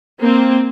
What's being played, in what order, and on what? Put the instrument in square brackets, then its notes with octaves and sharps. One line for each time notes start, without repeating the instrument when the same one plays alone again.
[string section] A#3 C4